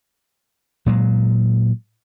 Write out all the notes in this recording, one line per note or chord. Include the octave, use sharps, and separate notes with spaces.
A#2 F#3 G#3